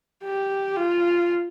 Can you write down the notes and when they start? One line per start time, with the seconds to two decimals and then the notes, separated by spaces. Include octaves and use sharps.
0.24 G4
0.76 F4